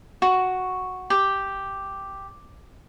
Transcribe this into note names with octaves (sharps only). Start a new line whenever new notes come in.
F#4
G4